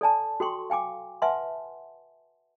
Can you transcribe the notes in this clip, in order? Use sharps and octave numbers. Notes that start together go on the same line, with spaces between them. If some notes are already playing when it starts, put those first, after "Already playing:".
A4 D5 G#5 A5
F#4 A4 G5 C6 C#6
F5 G5 G#5 D6
B4 E5 F#5 G#5 A5 C6